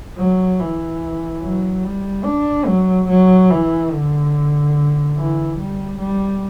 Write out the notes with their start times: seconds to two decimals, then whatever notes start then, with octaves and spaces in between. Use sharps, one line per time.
0.17 F#3
0.60 E3
1.42 F#3
1.84 G3
2.25 D4
2.66 F#3
3.08 F#3
3.51 E3
3.92 D3
5.17 E3
5.59 G3
5.99 G3